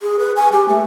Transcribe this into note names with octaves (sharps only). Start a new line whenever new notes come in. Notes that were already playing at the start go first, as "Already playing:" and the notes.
G#4
B4
G#5
G4
A3